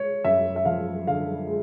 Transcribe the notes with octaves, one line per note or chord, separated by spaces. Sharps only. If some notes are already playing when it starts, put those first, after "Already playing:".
Already playing: G#3 C#5
F#2 E5
E5
F3 F5
D3 F5
G#3